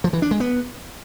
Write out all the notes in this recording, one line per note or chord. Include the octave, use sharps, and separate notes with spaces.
F3
E3
D4
G#3
B3